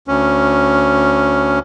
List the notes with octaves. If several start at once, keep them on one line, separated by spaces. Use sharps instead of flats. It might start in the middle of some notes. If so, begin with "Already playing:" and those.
D2 C#4